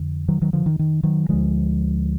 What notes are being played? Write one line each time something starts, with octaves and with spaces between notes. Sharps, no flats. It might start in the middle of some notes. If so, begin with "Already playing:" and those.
Already playing: F2 D3
D#3 F#3
D#3 F#3
D3 F3
D#3
D#3
D#3 F#3
D2 D3 F3 G#3